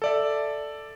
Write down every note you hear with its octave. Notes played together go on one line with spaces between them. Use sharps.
A4 D5 E5